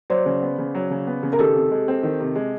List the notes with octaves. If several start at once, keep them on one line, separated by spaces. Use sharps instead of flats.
F#3 C5 D5
C#3
B3
C#3
F#3
C#3
B3
C#3
A#4
D#3 G4 A4
C3
G#3
C4
D#3
C3
G#3